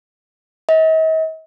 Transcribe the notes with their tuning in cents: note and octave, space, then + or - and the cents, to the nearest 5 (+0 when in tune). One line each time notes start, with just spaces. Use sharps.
D#5 +45